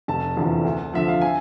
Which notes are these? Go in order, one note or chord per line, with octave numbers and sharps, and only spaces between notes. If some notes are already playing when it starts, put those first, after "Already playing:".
F1 A5
E2 D3 F3
D2
D3 F3 E5
F5
G#5